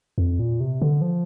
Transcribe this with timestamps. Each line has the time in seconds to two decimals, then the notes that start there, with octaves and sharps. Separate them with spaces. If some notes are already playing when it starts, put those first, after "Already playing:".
0.18 F2
0.39 A#2
0.60 C3
0.82 D3
1.01 F3